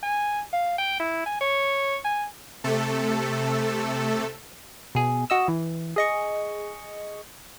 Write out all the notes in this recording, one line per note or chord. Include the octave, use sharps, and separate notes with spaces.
G#5
F5
G5
E4
G#5
C#5
G#5
C3 A3 A4
B2 G#4
F#4 D#5 E6
E3
G#4 D#5 C#6